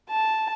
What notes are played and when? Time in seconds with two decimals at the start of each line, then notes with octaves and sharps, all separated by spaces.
0.10 A5